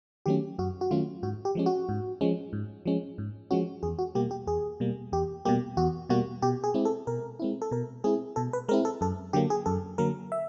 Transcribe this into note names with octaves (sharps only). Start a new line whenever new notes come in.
D#3 F#3 A3 C#4 G4
F#2 F#4
F#4
D#3 F#3 A3 C#4 F4
G#2 F#4
G4
F3 G#3 C#4
F#4
G#2
F3 G#3 C#4
G#2
F3 G#3 C#4
G#2
F3 G#3 C#4 F#4
E2 G#4
F#4
B2 G3 A#3 G4
G4
E2 G#4
B2 G3 A#3
E2 G4
B2 G3 A#3 G4
E2 F#4
B2 G3 A#3 F#4
B2 G4
G#4
G#3 C4 E4
A4
B2 A#4
G#3 C4 E4
A4
B2 A#4
G#3 C4 E4 G#4
B2 A4
B4
G#3 C4 E4 A#4
A4
F#2 A4
D3 F#3 A#3 G4
G#4
F#2 A4
D3 F#3 A#3 A#4
E5